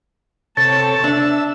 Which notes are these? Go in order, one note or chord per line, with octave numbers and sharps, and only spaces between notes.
C3 A4 C#5 A5 A6
D4 E5 E6